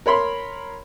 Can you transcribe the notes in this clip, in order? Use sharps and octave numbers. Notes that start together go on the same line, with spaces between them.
A#4 C#5 B5 C6